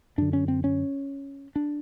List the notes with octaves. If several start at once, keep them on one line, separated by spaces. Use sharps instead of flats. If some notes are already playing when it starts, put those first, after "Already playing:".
F#2 D3 D4
C#4
C4
C#4
D4